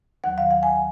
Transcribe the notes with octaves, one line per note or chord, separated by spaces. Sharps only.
D#2 D#3 F#3 F#5
F5
F#5
G#5